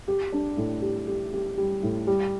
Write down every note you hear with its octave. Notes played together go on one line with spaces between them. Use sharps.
G4
D4
A2
G4
G4
G4
G3
A2
G3